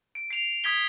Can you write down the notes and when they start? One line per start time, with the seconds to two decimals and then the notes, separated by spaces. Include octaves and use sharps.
0.15 D7
0.30 C7 F7
0.64 D#6 G#6 B6 G7